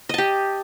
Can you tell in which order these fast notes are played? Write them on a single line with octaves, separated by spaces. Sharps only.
D#5 A5 G4